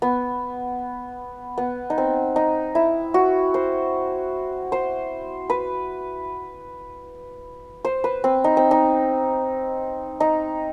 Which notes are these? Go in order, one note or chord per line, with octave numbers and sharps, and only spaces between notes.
B3
B3
D#4
C4
D#4
E4
F#4
C5
C5
B4
C5
B4
C4
D#4
C4
D#4
D#4